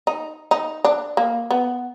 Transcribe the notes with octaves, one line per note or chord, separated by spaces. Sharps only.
D#4
D#4
D4
A#3
B3